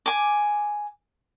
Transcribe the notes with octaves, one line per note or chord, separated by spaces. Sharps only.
G#5 D6